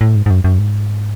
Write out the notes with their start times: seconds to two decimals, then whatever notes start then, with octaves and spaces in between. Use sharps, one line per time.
0.01 A2
0.15 G#2
0.26 G#2
0.30 F#2
0.44 F#2
0.59 G#2